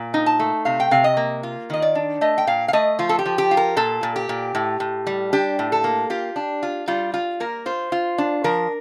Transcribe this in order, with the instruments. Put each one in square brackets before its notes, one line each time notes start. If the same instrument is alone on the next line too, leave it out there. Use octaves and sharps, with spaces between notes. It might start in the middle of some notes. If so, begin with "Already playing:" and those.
Already playing: [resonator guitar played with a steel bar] A#2
D#4
A5
A3
C3 F5
G5
C3 F5
D#5
A#3
F4
D#3 D#5
D5
D4
A3 D#5
G5
A#2 F5
F5
A3 D#5
F3 F4
A4
G4
F3
G4
F4
A#4
A#2 A4
A#2
G4
A#2
A2
A2
G3
D4 G4
A2
A4
A#3
F4 G4
D4
F4
G3 F4
F4
A#3 A#4
F4 C5
F4
D4
F3 A#4